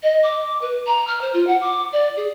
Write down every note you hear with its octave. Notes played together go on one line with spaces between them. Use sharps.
D#5
D6
B4
A#5
F6
C5
F4
F#5
D6
D5
G#4